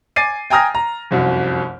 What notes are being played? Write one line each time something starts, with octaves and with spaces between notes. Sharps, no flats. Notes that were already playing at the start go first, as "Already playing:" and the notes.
G#5 D6 A6 C7 D#7
G5 G#5 A#5 D#6 F6 A#6
A#5
F1 C2 F#2